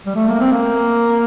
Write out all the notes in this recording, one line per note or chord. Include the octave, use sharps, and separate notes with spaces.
G3
A3
A#3
C4
A#3